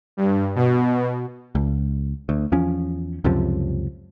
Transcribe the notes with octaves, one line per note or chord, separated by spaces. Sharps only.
G2
B2
C#2
D2
E2 F3 C#4
C#2 F#2 C3 F3